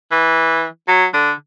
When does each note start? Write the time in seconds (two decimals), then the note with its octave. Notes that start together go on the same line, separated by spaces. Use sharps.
0.12 E3
0.88 F#3
1.14 D3